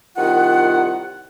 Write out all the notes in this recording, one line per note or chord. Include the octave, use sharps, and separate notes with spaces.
C2 D#3 F4 F#5